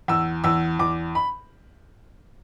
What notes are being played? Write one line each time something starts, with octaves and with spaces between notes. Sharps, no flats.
E2 E6
E2 E6
E2 D6
B5